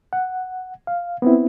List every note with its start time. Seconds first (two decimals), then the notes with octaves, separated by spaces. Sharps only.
0.13 F#5
0.87 F5
1.22 B3 C4 E4